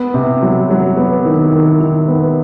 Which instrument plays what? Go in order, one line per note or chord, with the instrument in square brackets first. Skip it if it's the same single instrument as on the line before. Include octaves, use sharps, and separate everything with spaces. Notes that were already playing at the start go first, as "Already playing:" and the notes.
Already playing: [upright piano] B3
C3
F#3
F#3
B3
D#3
D#3
D#3
B3